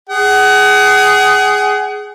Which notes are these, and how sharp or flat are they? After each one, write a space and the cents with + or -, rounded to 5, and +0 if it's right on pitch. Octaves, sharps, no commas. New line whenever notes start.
G#4 +0 F#5 +35